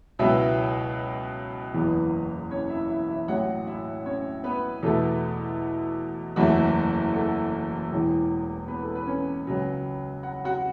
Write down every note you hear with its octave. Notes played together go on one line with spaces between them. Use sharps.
C#2 B2 F#3 B3 E4 E5
F#1 E2 E3 B3
C#4 C#5
E4 E5
E4 E5
E4 E5
A1 A2 F#3 F#4 F#5
E4 E5
C#4 C#5
B3 B4
E2 B2 A3 A4
F#1 E2 E3 A3 F#4
A4
E1 E2 E3
B3 B4
A4
B4
C#4 C#5
C#2 C#3 F#3 B3
F#5
F#4 F#5